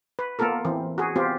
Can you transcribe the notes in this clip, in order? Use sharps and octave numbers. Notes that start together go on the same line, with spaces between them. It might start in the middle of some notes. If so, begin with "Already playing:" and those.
B4
A#3 B3 F4 A4 A#4
E3 C4
F#4 G#4
B3 C4 F4 G4